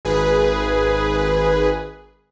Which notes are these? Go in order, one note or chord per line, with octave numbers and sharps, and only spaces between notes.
G#1 G#4 B4